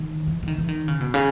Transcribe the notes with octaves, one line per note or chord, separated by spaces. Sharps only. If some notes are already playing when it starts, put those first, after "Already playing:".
Already playing: D#3
E3
E3
D#3
E3
D#3
C#3
B2
C#3